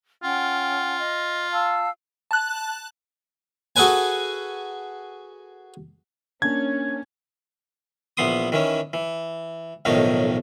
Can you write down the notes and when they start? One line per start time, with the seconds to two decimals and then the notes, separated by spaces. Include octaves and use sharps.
0.23 C#4 F4 F#5 G5
0.99 D#5
1.52 F5 A5 E6
2.31 A5 F#6
3.76 F#4 G#4 A4 B4 G#5
6.42 A#3 C#4 D4 G#6
8.17 A#1 E3 B3 C6 D#6
8.52 D#3 E3 C#4
8.93 E3
9.85 B1 F2 A2 D#3 D#4 C#5